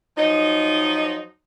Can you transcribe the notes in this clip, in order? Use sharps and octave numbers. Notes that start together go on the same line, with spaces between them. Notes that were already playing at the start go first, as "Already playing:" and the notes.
F3 F#3 D#4